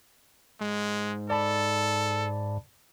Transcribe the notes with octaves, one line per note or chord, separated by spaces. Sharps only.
G#2 G#3
A4 D5 A5 B5